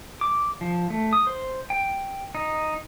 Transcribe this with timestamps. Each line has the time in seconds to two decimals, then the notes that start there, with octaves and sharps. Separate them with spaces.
0.21 D6
0.61 F3
0.90 A3
1.13 D#6
1.27 C5
1.70 G5
2.35 D#4